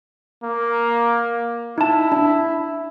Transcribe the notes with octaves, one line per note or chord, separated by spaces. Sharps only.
A#3
D#4 E4 A5
D4